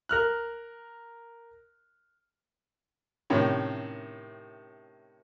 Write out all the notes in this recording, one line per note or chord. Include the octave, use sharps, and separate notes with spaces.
A#4 F6 F#6
A2 C3 D#3 C#4